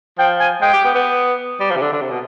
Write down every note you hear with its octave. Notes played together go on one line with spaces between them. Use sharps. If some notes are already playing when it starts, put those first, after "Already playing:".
F3 G5
G#5
G#3 G5
G4
B3
B3
G3
F3
C3
D3
D3
C3
B2